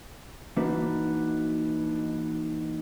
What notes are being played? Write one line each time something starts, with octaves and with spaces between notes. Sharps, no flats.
E3 A#3 D4 D#4 F#4 B4